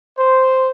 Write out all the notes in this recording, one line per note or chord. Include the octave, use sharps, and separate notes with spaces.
C5